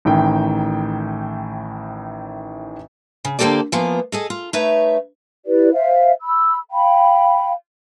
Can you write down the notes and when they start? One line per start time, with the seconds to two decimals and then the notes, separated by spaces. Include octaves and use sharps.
0.05 A1 A2 D#3 G5
3.25 C#3
3.39 D3 F3 A#3 G4 A4 D5
3.72 E3 F3 A#3 B3
4.12 G#4 A4 D#5
4.30 F4
4.53 A3 D#4 B4 C#5 E5
5.46 E4 G4 B4 D5
5.73 C5 E5 F5
6.21 B5 E6
6.71 F5 G5 B5